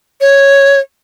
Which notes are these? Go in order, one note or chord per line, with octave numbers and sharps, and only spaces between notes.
C#5